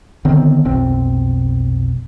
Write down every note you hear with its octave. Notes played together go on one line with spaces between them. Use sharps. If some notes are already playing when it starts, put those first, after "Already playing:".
D3 D#3 B3 C4
F1 B1 C4